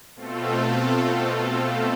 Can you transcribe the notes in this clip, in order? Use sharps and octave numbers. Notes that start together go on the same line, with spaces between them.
B2 A3 C4 F4 A4